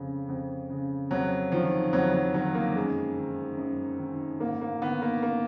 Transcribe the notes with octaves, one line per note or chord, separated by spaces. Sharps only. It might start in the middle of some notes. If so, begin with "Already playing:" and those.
Already playing: F2 C#3
F2
C#3
F2 F#3
D#3 F3
F2 F#3
F#3
D#3 F#3
A#3
F#2 G#3
D#3
F#2
D#3
G#2 A#3
A#3
D#3 B3
A#3
A#3